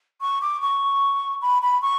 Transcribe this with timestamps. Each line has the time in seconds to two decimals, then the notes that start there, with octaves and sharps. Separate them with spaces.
0.20 C#6
0.41 D6
0.61 C#6
1.41 B5
1.62 B5
1.81 C#6